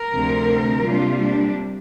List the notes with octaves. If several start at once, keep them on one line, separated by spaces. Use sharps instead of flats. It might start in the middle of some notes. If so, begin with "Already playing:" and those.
Already playing: A#4
D2 C3 F3 C4
C3 G3 A#3 D4 F4
D4